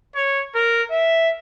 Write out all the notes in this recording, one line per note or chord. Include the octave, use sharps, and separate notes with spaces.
C#5
A#4
E5